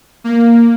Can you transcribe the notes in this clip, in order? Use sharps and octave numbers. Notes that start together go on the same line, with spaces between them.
A#3